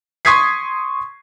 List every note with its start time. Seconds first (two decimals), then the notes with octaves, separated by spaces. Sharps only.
0.25 C6 C#6 D#6 G#6 B6 C7